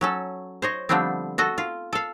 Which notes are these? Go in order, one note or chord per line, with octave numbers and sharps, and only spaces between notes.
F#3 C#4 A4
C5 C#5 D#5
D3 F3 G3 A3 B3 C4
F#4 A4 D#5
F4
A4 F5